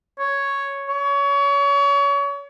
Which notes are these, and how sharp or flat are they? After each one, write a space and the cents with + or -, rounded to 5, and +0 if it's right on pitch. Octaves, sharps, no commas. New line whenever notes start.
C#5 +0
C#5 +30